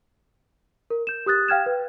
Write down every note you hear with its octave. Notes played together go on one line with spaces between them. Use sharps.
A#4
G6 E7
G4 D#6 F#6 A6
F5 G5 F6 G#6 E7
B4